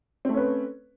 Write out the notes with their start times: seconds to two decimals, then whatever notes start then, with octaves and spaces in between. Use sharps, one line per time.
0.25 C4
0.29 A3
0.33 C#4
0.37 B4